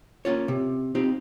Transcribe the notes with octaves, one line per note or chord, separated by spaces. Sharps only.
A#3 C#4 F4 C#5
C3
C4 D#4 F4 G4